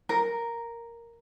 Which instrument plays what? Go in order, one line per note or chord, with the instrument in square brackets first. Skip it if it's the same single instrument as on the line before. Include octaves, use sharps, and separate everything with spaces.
[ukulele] A#4